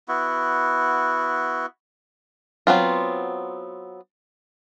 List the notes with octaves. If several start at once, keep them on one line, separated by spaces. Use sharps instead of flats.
B3 E4 F#4
F#3 B3 C4 F4